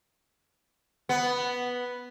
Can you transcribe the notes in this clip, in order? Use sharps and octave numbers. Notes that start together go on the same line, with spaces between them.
B3